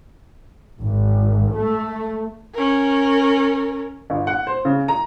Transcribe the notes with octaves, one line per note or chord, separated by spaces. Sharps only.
G#1
A3
C#4 A#4
G1
F#5
C5
C#3
A#5